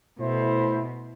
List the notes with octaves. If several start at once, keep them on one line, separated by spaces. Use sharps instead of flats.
B2 A3 E4 C5